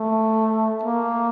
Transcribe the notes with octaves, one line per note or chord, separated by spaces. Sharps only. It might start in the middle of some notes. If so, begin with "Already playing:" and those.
Already playing: A3
A#3